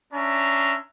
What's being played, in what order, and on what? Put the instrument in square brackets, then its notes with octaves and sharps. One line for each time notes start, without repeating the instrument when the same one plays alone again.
[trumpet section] C#4 D4 E5 A#5 C6